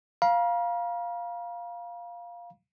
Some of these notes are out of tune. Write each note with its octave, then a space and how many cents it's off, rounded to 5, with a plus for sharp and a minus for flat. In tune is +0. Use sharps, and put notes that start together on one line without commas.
F5 +0 A#5 +45